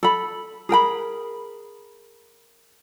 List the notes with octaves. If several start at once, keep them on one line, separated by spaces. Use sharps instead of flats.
A4 B5
G#4 A#4 G5 B5